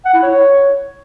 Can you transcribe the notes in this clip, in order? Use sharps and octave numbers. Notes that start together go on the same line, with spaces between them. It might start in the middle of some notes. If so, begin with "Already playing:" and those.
F#5
E4
C#5